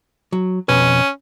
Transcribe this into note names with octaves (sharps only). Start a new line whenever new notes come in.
F#3
F2 B2 C#4 B4